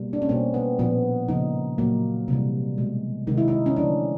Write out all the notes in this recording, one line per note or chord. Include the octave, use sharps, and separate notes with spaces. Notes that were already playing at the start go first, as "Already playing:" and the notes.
Already playing: B2 G3 A#3
D4
C#4
B2 G3 A#3 C4
B3
A#2 F3 A#3 B3
C#3 F3 A#3 D#4
A#2 F#3 A#3
C3 E3 G3
B2 G#3
C3 D#3 G#3 D#4
E4
D#4
C#4
D3 F3 A3 D4